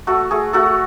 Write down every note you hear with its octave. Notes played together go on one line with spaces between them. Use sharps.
A3 F#4 A4
A3 G#4
A3 F#4 A4